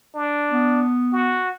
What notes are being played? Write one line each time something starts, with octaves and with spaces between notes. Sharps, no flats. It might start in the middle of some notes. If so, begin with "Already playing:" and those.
D4
B3
F#4